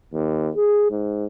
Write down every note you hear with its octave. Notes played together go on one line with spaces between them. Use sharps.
D#2
G#4
G#2